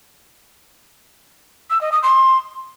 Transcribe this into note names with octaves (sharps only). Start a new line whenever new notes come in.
E6
D#5
D#6
C6